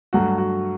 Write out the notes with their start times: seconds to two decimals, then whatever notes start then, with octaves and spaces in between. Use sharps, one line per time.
0.13 G2 F#3 A3 F#4
0.38 F#4